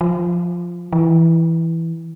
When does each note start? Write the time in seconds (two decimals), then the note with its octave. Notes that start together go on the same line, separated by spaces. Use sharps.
0.01 F3
0.93 E3